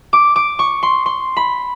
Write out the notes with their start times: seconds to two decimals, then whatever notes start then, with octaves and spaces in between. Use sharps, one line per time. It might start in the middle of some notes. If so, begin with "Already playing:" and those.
0.13 D6
0.36 D6
0.59 C#6
0.83 C6
1.06 C6
1.37 B5